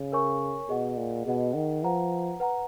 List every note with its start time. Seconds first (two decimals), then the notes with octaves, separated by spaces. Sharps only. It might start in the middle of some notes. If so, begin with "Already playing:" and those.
Already playing: C#3
0.12 A#4 C#5 G#5 C#6
0.69 B2 G#4 D#5 F#5
0.97 A#2
1.26 B2 G#4 D#5 F#5
1.54 D#3
1.84 F3 B4 F#5 A#5
2.40 B4 F#5 A#5